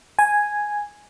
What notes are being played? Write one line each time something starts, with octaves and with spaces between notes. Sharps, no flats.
G#5